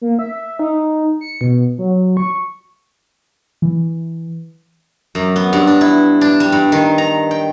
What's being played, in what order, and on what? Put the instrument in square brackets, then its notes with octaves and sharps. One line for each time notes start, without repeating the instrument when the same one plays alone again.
[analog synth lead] A#3
E5
D#4
C#7
B2
F#3
C#6
[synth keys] E3
[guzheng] F#2
B3
G2
D4
E4
D4
G3
G2
D#3
A#5
G5